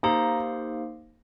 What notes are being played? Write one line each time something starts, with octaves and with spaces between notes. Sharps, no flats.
A#3 D#4 G4 C5 F5 A#5